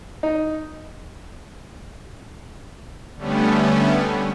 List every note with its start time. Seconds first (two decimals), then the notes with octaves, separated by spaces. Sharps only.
0.23 D#4
3.17 D3 G3 A3 B3 C#4